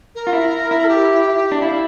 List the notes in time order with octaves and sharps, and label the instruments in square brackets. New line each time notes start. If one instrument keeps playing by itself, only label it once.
[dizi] A#4
[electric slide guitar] F4
E4
E4
[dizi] A4
G4
[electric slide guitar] D4
[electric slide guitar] E4 [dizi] F5